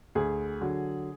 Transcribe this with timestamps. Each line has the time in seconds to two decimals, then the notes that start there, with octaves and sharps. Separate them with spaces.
0.15 D2 G#4
0.61 D3 F#3